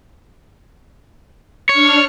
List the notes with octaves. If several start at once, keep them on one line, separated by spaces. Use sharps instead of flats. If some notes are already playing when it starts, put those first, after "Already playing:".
D4 C#5 F6 C#7